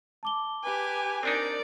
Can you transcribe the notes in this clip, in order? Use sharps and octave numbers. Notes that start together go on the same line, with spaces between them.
A5 D6 G7
G4 B4 G#5
C4 D4 D#4 A#4 D5